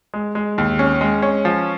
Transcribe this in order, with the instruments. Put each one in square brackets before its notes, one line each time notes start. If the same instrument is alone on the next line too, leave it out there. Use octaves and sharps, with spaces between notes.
[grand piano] G#3
G#3
D#2
C#4
G#3
C#4
F3